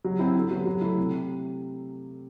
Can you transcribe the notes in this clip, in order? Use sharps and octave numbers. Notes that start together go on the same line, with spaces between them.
F#3
C4 E4
D3
F#3 B3
F#3
A3 E4
C3